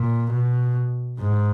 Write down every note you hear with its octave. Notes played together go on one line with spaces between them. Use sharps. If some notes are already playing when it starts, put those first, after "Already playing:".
Already playing: A#2
B2
G#2